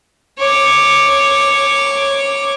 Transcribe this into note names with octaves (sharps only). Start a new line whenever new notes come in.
C#5 D6